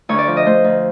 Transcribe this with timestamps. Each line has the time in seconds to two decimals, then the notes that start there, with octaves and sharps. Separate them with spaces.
0.09 D2 C#5
0.19 D5
0.27 F3
0.37 D#5
0.46 A3 C5
0.64 D2